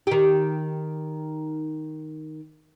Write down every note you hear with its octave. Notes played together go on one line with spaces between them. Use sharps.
D#3 G4